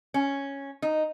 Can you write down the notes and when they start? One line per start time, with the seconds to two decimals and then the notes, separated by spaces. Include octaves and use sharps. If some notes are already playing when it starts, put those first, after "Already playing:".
0.14 C#4
0.82 D#4